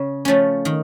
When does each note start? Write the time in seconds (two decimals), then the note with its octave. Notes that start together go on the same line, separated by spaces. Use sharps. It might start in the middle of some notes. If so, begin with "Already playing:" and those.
Already playing: C#3
0.25 F3 A3 C#4
0.65 D#3